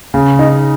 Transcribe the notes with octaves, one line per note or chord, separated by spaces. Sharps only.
C#3
D#4